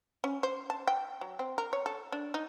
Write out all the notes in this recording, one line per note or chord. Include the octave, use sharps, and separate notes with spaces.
C#4
C5
A5
G5
F#3
C4
A#4
C#5
A4
D4
D#4